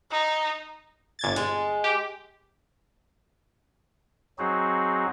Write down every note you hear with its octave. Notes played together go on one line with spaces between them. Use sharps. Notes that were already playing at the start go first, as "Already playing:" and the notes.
D#4
G1 G#6 A6
G#3
G4
F#3 C4 D#4 F#4 G#4